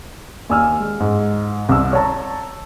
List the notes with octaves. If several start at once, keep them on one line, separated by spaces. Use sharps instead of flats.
D#2 G#5 E6 F6
G#3
G#2
C2 E6
C#5 A5 A#5